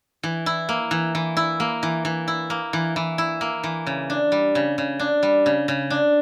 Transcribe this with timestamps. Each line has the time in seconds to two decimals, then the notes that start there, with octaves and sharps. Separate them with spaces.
0.23 E3
0.46 E4
0.69 A#3
0.91 E3
1.15 E3
1.37 E4
1.60 A#3
1.83 E3
2.05 E3
2.28 E4
2.50 A#3
2.73 E3
2.96 E3
3.18 E4
3.41 A#3
3.64 E3
3.86 C#3
4.10 D4
4.32 G3
4.55 C#3
4.78 C#3
4.99 D4
5.23 G3
5.46 C#3
5.68 C#3
5.90 D4